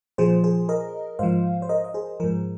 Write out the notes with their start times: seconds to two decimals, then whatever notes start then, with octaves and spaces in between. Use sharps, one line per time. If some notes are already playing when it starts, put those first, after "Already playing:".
0.18 A#2 F3 G#4 C5
0.44 G#4 C5
0.69 A#4 D#5
1.19 G#2 F3 C5 F5
1.62 C5
1.69 A#4 D#5
1.84 D#5
1.94 G#4 C5
2.20 G#2 F3 A#4